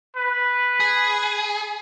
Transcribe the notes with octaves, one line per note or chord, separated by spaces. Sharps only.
B4
G#4